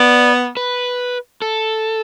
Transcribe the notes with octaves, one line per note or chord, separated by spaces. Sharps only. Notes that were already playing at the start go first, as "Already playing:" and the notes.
Already playing: B3 D5
B4
A4